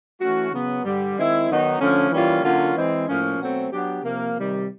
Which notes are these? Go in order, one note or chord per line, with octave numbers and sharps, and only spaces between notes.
E3 A3 C#4 F#4
C#3 F#3 B3
G2 D3 G3
D#3 G#3 C4 E4
D#3 F#3 B3 D#4
D3 F3 A3 C#4
E3 G3 A#3 C#4 F4
D3 F#3 A#3 C#4 F4
E3 G#3 C4
A2 F3 A#3 C#4
B2 F#3 A3 C4
F#3 B3 D4 G4
C3 F3 A#3
C3 D#3 G3